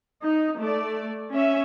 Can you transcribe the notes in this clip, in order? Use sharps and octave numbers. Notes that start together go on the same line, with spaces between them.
D#4
A3 D5
C#4 E5